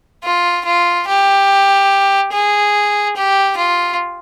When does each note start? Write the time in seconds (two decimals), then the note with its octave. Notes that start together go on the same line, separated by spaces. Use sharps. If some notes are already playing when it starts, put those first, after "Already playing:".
0.24 F4
0.66 F4
1.08 G4
2.33 G#4
3.16 G4
3.57 F4